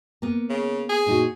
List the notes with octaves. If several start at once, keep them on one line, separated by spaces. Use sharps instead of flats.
A#3 B3
C#3
G#4
A#2 D#4 F#4